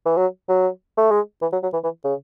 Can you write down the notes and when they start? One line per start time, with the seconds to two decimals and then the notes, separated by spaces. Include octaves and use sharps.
0.06 E3
0.17 F#3
0.49 F#3
0.97 A3
1.11 G#3
1.42 E3
1.53 F#3
1.63 F#3
1.73 E3
1.84 E3
2.04 C#3